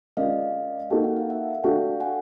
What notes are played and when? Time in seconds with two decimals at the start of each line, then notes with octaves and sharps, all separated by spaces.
0.17 G#3 C#4 F4 A#4 D5 D#5 F5
0.90 A#3 D#4 F#4 A4 G5
1.04 F#5
1.17 F5
1.30 E5 F#5
1.64 A3 D4 F#4 F5 G5
2.00 F#5 G#5